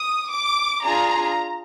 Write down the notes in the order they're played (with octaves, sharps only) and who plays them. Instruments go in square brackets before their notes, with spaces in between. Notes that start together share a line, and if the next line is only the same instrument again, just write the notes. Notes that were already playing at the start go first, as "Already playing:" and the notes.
Already playing: [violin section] D#6
D6
D4 F4 G#4 A#5